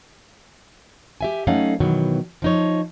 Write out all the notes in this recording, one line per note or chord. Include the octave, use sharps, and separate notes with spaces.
G4 E5 G#5
F#3 A3 C#4 D#4 F5 F#5
B2 D#3 E3 F#3
F3 D#4 C#5